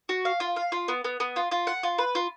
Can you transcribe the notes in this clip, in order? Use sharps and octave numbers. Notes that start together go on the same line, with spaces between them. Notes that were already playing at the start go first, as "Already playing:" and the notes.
F#4
F5
F4
F5
F4
B3
B3
B3
F4
F4
F#5
F4
B4
F4